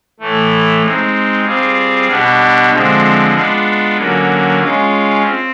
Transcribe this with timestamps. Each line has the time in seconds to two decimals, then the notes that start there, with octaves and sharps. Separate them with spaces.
0.20 A2 E3 A3
0.83 G#3 C4 D#4
1.45 G3 C4 F4 G#4
2.08 B2 G3 B3 D4
2.71 D3 F3 G#3 C4
3.33 G#3 B3 D4 F4
3.96 D3 F#3 A#3 C#4
4.59 G#3 C#4 F4
5.22 C4